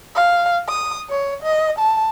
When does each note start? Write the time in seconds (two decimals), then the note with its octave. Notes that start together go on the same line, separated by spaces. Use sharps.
0.15 F5
0.68 D#6
1.09 C#5
1.42 D#5
1.78 A5